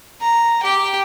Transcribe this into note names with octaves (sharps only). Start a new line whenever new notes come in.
A#5
G4 G5